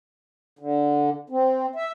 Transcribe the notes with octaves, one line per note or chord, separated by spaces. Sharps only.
D3
C4
E5